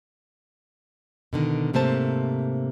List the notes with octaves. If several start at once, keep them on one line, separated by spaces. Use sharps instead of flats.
B2 D3 D#3
G#2 C3 A3 A#3 C5 A5